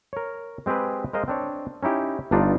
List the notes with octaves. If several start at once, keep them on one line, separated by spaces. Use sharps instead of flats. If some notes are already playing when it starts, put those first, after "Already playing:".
A#4 C#5
G#3 C4 G4 G#4 B4
G#3 A#4 C5 D#5 F5
C4 D4 C#5
C#4 D#4 E4 G4
G1 G2 D4 D#4 F4 D5